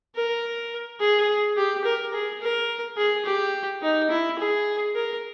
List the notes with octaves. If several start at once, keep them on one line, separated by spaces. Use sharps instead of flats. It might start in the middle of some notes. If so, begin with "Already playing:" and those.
A#4
G#4
G4
A#4
G#4
A#4
G#4
G4
D#4
E4
G#4
A#4